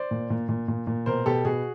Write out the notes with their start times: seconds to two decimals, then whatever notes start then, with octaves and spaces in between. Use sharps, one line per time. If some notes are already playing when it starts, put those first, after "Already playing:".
Already playing: C5 D5
0.11 A#2
0.30 A#2
0.49 A#2
0.68 A#2
0.87 A#2
1.06 B2 A#4 C5
1.26 B2 G4 A4
1.45 B2 F#4 G#4